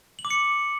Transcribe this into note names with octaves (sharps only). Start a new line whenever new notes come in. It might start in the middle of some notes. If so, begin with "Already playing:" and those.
F#7
D6
C#7